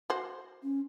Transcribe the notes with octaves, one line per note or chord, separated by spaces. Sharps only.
F#4 C5
C#4